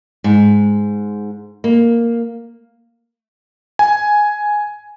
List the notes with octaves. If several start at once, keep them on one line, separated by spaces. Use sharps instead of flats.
G#2
A#3
G#5